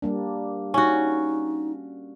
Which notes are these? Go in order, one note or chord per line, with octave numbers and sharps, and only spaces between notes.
G3 A#3 D4
C#4 D#4 F#4